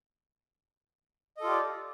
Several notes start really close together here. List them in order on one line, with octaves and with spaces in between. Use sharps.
D#5 A4 F4 G4 D5